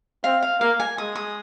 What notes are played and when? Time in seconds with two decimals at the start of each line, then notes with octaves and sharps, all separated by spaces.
0.24 C4 F5
0.43 F5
0.61 A#3 F5
0.80 G#5
0.98 G#3 D#6
1.16 D#6